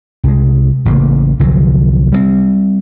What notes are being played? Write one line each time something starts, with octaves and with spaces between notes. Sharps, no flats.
C2 G#3
A1 C#3 F#3 A#3
C2 D3 F3 F#3
G3 A3 C4